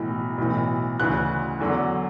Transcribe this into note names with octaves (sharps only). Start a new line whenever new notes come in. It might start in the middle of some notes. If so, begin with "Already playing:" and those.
Already playing: B1 A2 E3
B1 A2 E3
D2 C#3 E3 F#6
E2 D3 F#3